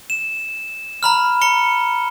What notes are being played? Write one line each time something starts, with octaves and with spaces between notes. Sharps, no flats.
E7
A#5 B5 F6
A#5 C#7 G7